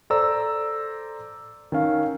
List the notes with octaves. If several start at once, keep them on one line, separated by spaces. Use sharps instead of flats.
A4 C5 D5 A#5 E6
D#3 C#4 F5